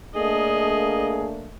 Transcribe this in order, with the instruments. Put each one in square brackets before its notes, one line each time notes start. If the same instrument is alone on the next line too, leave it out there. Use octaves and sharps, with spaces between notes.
[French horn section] A3 A#3 D4 [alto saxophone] G#4 [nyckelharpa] D#5